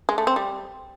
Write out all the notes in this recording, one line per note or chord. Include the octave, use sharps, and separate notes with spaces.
G#3
A3
C4
G3